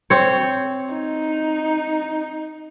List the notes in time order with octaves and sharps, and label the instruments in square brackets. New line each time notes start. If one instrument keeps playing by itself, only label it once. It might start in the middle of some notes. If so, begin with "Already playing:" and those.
[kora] C4 C#5
[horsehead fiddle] D#4